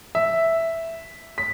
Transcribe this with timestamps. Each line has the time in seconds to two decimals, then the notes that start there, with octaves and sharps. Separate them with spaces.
0.15 E5
1.38 B6